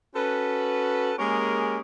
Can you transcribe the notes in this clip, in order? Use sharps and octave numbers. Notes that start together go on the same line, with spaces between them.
C#4 F#4 A4 B4
G#3 A#3 C#4 G4 G#4 A#4